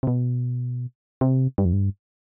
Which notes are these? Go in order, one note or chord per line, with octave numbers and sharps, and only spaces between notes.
C3
B2
C3
G2
F2
G2